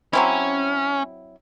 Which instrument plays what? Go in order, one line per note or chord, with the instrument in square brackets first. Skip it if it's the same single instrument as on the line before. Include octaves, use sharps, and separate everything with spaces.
[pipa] F#3 C4 E4 [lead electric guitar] C#4